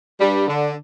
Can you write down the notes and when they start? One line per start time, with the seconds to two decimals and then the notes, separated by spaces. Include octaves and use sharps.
0.19 G2 G3
0.48 D3